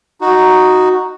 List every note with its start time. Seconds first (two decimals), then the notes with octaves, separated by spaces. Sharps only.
0.21 D#4 F#4